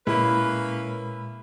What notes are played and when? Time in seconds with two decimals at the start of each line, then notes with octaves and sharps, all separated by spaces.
0.07 A#2 G#3 A#3 C#4 E4 B4 B5